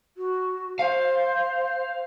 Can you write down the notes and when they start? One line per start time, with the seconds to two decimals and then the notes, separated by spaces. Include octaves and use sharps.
0.17 F#4
0.79 C5 F5